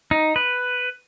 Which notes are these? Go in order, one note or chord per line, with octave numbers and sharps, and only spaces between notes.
D#4
B4